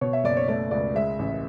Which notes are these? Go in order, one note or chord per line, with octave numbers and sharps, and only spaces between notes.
B2 C#5
E5
F#1 D5
C#5
A3 D5
C#2 D5
G#3 E5
A1